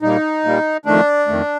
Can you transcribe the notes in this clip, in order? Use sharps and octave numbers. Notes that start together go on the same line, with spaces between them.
A#2 G3 A#3 D#4
A#2 G3 A#3
F2 D#3 A3 D4
F2 D#3 A3